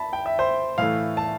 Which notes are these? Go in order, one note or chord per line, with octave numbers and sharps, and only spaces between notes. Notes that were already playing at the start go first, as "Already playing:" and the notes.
Already playing: A5 B5
G5
E5
C5
A2 E3 A3 F5
A5